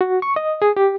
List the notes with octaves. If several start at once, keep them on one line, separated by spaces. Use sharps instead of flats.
F#4
C#6
D#5
G#4
G4